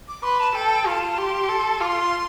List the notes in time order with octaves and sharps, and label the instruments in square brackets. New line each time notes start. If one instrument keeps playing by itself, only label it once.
[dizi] D6
[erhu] B4 [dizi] C6
[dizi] A5
[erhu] A4 [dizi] G5
[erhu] F4 [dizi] B5
[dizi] A5
[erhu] G4 [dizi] C6
[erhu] A4
[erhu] F4 [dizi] D6
[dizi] C6